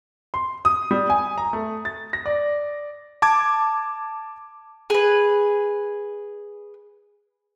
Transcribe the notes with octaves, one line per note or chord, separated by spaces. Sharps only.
C6
D#6
G3
G#5
A#5
A3
A6
A#6
D5
A5 D6 G#6
G#4 B4